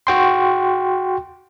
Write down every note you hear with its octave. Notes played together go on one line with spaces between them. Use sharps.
F#4 G5 C6